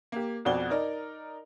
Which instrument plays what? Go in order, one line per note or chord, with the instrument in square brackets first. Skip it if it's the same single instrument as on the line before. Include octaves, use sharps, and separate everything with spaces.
[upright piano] A#3 G4
F2 B2 F#4 D5 G7
D#4 A#4 D5